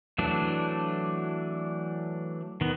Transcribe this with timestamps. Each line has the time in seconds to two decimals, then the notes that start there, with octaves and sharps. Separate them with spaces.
0.18 E3 F#3 A3 D4
2.61 D#3 B3